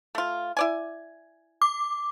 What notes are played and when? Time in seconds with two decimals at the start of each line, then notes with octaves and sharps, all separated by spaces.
0.15 A3 F4
0.57 E4 D5 G#5
1.62 D6